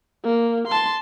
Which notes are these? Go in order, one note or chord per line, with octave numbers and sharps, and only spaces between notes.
A#3
A5 C6